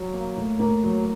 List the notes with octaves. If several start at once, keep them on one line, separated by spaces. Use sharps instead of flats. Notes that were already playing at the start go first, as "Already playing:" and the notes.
Already playing: F#3
A#3
A2
A2 A#3
F#3